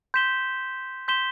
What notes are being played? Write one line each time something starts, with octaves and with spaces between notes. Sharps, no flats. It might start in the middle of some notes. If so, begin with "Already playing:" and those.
C6 G6 B6 E7 G7
C6 G6 B6 E7 G7